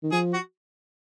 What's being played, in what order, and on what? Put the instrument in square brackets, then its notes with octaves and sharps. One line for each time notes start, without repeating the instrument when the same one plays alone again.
[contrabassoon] D#3
[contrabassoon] F3 [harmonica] G#4
[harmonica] F#4